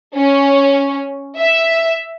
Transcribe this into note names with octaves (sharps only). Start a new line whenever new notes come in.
C#4
E5